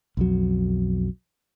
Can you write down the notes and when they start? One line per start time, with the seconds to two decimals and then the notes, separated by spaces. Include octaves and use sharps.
0.17 B1 F2 F#3